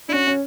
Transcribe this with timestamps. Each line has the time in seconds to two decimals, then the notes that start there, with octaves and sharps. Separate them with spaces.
0.09 D4 E4
0.13 C#4 F#4
0.27 C#4